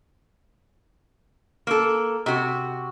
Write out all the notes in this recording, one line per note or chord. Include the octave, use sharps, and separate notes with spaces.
A#3 A4
C3 F#4